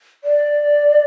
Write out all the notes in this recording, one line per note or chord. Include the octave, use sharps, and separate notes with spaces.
D5